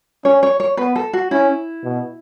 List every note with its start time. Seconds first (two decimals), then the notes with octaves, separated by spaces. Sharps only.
0.24 C#4 C#5
0.43 C#5
0.60 C#5
0.77 B3 B4
0.96 A4
1.13 F#4
1.31 C#4 E4
1.84 B2